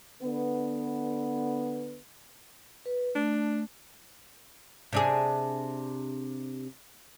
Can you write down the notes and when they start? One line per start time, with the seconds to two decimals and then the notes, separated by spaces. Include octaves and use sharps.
0.22 D3 B3
2.86 B4
3.15 A3 D4
4.93 C3 D4 G#4